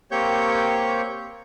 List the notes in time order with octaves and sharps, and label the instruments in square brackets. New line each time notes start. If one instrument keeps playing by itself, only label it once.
[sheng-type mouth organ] A#3 C4 G4 C#5 C#6 G6